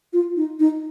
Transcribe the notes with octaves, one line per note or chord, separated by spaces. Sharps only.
F4
D#4
D#4